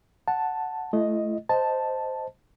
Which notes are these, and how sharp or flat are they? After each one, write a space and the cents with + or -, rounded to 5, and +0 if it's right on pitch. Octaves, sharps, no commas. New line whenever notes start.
F#5 +0 A5 +0
A3 -20 E4 +35 D#5 +0
C5 -10 D#5 +0 A5 +0